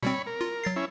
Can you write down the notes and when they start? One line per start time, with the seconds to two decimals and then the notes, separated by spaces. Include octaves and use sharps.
0.03 B2 G3 C4 C#5 B5
0.27 A#4
0.41 F4
0.64 F#3 A6 C7
0.76 C#4 E4